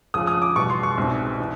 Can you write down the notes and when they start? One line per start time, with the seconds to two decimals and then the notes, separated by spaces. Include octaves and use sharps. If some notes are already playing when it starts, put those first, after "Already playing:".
0.14 C#2 C#3 F3 D#6
0.27 D#6
0.42 D6
0.55 E2 B2 G3 C#6
0.70 C6
0.83 C#6
0.98 C2 B2 G#3 C4 D#4
1.40 E3